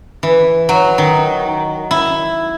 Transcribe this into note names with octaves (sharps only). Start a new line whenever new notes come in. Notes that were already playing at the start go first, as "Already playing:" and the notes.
E3
F#3
D#3
E4